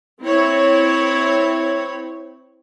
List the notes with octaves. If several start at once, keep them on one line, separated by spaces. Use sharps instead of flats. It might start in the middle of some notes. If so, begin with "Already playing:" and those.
C4 E4 C#5